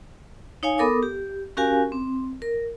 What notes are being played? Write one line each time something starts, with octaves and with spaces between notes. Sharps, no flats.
D#4 C#5 F5 G#5
B3 A4 A#4 D6 D#6
G4
C#4 F#4 G4 A#4 F5 G#5
C4
A#4